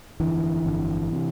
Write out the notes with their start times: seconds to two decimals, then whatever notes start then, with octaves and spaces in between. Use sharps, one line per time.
0.20 G1 F2 D3 E3
0.64 G1 F2 D3
1.12 C3